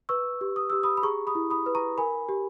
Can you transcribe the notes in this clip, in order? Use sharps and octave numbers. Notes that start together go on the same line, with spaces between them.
B4 C#6 E6
G4
D#6
G4 E6
B5 D#6
B5
G#4 A#5 C#6
B5 D#6
E4
B5 D#6
B4
A#5 C#6
A#4 G#5 B5
G4